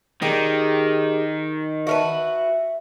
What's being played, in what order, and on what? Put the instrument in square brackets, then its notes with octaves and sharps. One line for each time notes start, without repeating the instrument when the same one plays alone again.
[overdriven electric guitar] D#3 [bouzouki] D#4 G4 G#4
[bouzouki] F#4 A#4 B4 [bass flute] E5